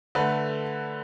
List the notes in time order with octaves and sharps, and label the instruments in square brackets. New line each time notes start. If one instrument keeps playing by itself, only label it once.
[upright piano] D3 A3 B4